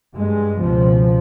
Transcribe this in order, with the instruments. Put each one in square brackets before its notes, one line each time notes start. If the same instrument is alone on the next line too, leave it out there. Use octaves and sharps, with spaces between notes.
[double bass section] G2 G#3
C#2 B2 F3